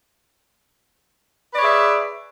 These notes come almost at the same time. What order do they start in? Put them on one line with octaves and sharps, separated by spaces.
B4 D5 C#5 G#4 E5